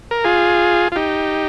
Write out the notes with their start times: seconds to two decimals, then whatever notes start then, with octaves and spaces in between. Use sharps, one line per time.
0.11 A#4
0.24 F4 G#4
0.92 F4
0.96 D#4 G4